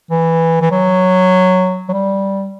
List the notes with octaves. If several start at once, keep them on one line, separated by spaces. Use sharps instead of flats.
E3
E3
F#3
F#3
G3